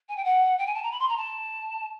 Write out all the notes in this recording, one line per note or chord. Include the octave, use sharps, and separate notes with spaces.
G#5
G5
F#5
G5
G#5
A5
A#5
B5
C6
A#5
A5